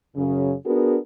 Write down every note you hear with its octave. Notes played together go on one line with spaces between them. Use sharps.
F#2 C#3
B3 D4 F#4 G#4 A#4